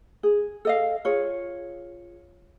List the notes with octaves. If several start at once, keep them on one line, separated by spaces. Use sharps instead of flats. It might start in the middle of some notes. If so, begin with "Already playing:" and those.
G#4
A4 D#5 F5
F4 G#4 C#5